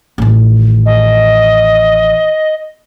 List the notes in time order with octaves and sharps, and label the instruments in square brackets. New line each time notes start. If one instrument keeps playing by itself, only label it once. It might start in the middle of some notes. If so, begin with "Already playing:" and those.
[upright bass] A1 D#3
[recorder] D#5